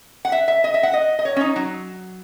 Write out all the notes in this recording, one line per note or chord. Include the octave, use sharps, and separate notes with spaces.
F#5
E5
E5
D#5
E5
F#5
D#5
D#5
C#5
C#4
D#4
F#3